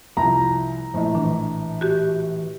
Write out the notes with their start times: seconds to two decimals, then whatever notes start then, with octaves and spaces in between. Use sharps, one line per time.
0.17 C2 F3 A#5
0.94 A#1 A2 F3 D#5
1.15 E3 D4
1.81 F#4 G4